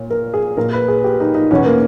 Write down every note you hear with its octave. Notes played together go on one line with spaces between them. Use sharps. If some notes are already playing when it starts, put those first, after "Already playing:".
Already playing: A#2 C#5
A#4
G#4
A#2 A#4
B4
G#4
G4
D#4
D#4
E2 B2 C#4
A#3